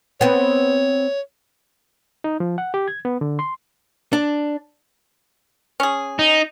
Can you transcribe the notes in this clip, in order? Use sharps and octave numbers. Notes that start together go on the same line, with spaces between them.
B3 C4 C#5
D#4
F3
F#5
G4
G#6
B3
D3
C6
D4
C#4 G#4
D#4